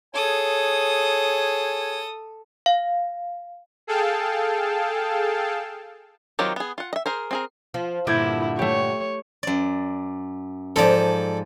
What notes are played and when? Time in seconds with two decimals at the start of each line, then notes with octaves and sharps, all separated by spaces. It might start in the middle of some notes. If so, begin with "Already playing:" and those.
0.14 G#4 A4 C#5 G#5 D#6
2.66 F5
3.87 G#4 A4 F5 G5 A5
6.39 D#3 F#3 C4 F4 G4
6.56 B3 G#4
6.78 F4 F#5
6.93 D#5 E5
7.06 G#4 A#4 C5
7.31 C4 G#4 A#4
7.74 F3
8.07 G2 A#2 D3 E4 D6 G6 G#6
8.59 A3 G4 C#5
9.43 F#2 D5
10.76 G#2 F3 A4 D5 D6